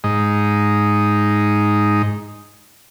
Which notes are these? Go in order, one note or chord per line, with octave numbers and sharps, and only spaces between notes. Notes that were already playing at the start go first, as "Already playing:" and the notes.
G#2 D#4